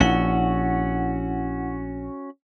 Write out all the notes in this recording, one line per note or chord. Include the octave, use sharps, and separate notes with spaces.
A#1 C#4 E4 F#4 F#5